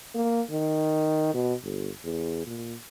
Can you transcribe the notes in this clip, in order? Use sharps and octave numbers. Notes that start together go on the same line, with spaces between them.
A#3
D#3
B2
G1
E2
A#2